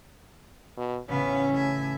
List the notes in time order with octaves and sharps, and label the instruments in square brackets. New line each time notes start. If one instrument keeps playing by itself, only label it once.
[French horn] B2
[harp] A1 C#3 [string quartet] B3 E5 F5 [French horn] C#4
[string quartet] A2 E5 G#5